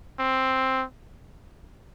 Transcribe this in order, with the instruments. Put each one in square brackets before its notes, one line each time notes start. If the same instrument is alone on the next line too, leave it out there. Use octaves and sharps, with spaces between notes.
[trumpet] C4